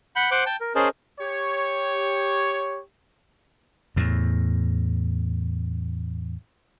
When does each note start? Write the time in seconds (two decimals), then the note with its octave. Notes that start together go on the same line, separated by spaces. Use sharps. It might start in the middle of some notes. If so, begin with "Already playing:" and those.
0.16 F#5 B5 G6
0.31 C5 F#5 D6 F#6 G6
0.46 G5 A5
0.61 A#4
0.75 C#4 G#4 A#4 C5 D#5 A5
1.20 G4 C#5
3.96 E2 A2